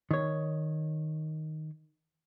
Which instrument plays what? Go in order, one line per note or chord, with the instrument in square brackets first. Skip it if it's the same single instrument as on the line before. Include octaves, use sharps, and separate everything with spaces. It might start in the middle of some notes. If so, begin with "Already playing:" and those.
[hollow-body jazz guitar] D#3 C#5